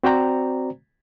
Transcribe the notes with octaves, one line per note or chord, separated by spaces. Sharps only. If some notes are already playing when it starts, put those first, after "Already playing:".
C4 F#4 C5 D5 G5 A#5